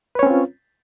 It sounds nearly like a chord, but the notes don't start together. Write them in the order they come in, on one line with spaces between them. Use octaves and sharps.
B4 C#5 C#4 C4 F4